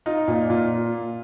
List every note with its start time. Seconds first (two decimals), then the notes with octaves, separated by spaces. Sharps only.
0.06 D#4 F4
0.27 A#2 F4
0.50 A#2 F4